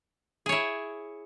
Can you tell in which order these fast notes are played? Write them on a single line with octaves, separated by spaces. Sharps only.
G#4 C#5 E4